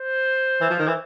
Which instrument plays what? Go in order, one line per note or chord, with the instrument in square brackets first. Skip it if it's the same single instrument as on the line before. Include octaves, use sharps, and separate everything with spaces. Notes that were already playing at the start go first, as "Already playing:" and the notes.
Already playing: [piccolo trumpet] C5
[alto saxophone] E3
F3
D#3
E3